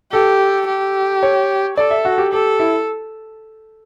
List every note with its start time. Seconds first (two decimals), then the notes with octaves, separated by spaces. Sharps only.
0.12 G4 A4
0.67 G4
1.23 C#5
1.77 A4 D5
1.91 E5
2.05 F#4
2.18 G4
2.33 G4 A4
2.60 E4